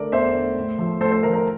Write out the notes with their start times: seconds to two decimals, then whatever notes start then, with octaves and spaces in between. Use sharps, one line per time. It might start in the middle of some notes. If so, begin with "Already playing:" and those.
Already playing: D3 A3 A#4 D5
0.12 E2 C5 E5
0.34 D3 A3
0.56 A2
0.78 F3 A3
1.01 A2 A4 C5
1.11 A4 C5
1.23 F3 A3 A#4
1.33 A#4